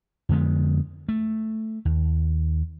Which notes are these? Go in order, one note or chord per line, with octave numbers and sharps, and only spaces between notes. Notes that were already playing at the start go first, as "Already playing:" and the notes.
F2 D3 G#3 B3
A3
D#2